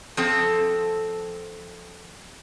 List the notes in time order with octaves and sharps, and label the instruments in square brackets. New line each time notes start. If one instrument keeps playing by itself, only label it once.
[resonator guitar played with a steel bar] F3 C4 A4